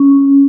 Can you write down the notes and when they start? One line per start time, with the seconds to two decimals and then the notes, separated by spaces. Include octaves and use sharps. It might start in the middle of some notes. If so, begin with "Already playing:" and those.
Already playing: C#4